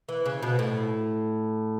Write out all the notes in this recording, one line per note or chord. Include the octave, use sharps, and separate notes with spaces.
E3
C#3
B2
A2